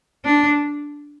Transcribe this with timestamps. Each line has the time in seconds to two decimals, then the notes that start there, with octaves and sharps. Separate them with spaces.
0.25 D4